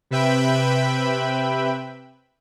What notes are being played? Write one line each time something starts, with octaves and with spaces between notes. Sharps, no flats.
C3 B4 E5 G5 B5